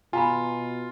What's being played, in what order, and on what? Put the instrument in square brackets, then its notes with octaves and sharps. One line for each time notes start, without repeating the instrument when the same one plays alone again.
[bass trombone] B2 [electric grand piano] F4 [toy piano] G#5 A#5 B5